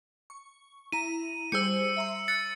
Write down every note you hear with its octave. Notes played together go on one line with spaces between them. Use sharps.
C#6
E4 A#5 D#7
G3 G#4 C5 E6 C#7
E5 A#5 C6
F#6 A6 C#7